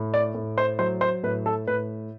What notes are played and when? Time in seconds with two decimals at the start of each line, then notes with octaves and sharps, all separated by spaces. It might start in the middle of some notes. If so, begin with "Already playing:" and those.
Already playing: A2
0.14 D5
0.35 A2
0.58 C5
0.79 F#3 C5
1.01 C5
1.23 A2 B4
1.46 A4
1.67 A2 B4